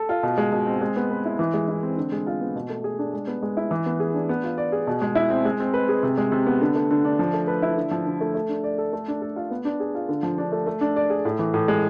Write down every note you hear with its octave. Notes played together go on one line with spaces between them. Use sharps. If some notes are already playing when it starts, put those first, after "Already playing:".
Already playing: A4
F4
B2
G#3
B2
C4
G#3
B3
B4
E4
E3
G#3
E4
C4
D3
G#3
F4
B3
B2
A3
G#4
D4
G#3
B3
G#3
E4
E3
B3
G#4
D4
B3
F4
D5
G#4
B2
G#3
E4
C4
G#3
C4
B4
G#4
C3
G#3
C3
B3
D3
A3
D3
D4
F3
A3
B4
E4
D3
F3
D3
A3
A3
D4
D5
A4
A3
D4
A4
F4
B3
D4
G#4
F4
D3
F3
D4
A3
A3
D4
D5
G#4
A2
E3
A2
G#3